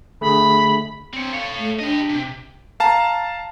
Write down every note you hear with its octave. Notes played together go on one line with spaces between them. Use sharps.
D3 A3 G#4 B5
C4 C#5
A4 C#5 F5
A3
D4 G4 D#5
C3
F5 A5 A#5